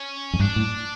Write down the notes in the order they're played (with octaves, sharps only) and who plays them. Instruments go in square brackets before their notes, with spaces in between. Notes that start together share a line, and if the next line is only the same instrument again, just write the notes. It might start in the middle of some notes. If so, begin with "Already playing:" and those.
Already playing: [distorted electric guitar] C#4
[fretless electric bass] F2
[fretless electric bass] G2 [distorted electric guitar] D4
[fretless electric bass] A2